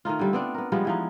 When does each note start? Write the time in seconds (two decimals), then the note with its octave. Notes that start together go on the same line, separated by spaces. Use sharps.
0.05 D#3 A3 D#4 F4
0.19 D3 G3 A4
0.33 B3 C4 D4
0.54 B3 A#4
0.72 F3 G3 G#3 B3
0.85 E3 F3 D#4